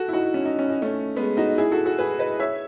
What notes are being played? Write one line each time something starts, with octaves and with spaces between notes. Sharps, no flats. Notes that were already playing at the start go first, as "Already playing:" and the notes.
Already playing: F#4 A4
E4
D#4 F#4
C#4
D#4
C#4
D#4
A3 C#4
G#3 B3
D#4 F#4
E4 G#4
F#4 A4
F#4 A4
G#4 B4
B4 D#5
C#5 E5